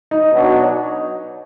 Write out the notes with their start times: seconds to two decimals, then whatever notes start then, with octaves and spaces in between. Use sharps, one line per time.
0.11 D#4
0.31 B2 F#3 D4